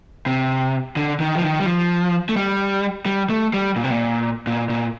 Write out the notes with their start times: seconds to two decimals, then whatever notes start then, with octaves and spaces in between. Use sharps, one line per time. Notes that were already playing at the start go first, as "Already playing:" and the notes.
0.26 C3
0.96 D3
1.20 D#3
1.35 F3
1.42 D#3
1.60 G3
1.66 F3
2.29 A3
2.37 G3
3.06 G3
3.30 A3
3.54 G3
3.76 A#2
3.84 C3
3.90 A#2
4.47 A#2
4.70 A#2